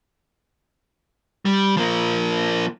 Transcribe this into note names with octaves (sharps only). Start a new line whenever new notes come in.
G3
F3 A#3